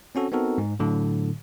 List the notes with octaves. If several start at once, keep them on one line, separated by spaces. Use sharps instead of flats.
C4 C#4 F#4 A4
B3 C4 D#4 F#4 A4 A#4
G#2
A2 D3 F#3